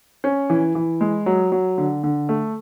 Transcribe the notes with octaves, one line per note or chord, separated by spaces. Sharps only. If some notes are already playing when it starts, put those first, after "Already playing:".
C#4
E3
E3
G#3
F#3
F#3
D3
D3
A3